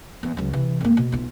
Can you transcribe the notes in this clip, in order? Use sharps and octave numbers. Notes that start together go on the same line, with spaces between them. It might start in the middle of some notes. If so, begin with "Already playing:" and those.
E2
C#2 F#3
C3 E3
G#1 A#3
B2
B1 F4